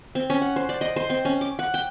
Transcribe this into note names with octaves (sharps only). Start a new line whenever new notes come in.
C4
C#4
F#5
C5
D5
D#5
C5
C4
C#4
D6
F#5
G5